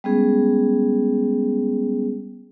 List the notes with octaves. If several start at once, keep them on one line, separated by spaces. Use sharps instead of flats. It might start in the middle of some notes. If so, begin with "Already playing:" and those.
G3 G#3 B3 C#4 G#4